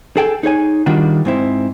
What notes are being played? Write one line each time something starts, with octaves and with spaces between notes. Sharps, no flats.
G#4 A4 G5
D#4 G#4 C#5 G#5
D#3 G3 D4 F4 F#4
G#2 C4 E4